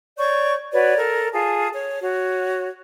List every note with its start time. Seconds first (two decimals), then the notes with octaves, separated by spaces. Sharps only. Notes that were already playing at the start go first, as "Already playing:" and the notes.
0.18 C#5 D5 C#6 G6
0.73 F#4 B4 C#5 D5
0.97 A4 A#4
1.33 F4 G#4 A5
1.73 C#5
2.01 F#4 C#5